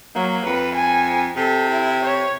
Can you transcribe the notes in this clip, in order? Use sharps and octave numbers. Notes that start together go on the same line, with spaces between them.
F#3 A#3
F2 B4
G#5
C3 A4
E4
C#5